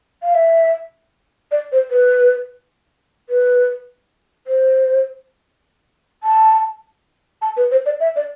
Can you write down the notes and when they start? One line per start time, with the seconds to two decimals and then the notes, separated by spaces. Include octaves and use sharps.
0.23 F5
0.34 E5
1.52 D5
1.72 C5
1.91 B4
3.29 B4
4.47 C5
6.23 A5
7.42 A5
7.57 B4
7.71 C5
7.86 D5
8.00 E5
8.16 D5